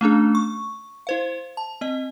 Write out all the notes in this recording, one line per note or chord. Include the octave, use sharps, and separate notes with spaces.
A3 C#4 D4 G#4
C#6
E4 C5 F5
A5
C4 D#5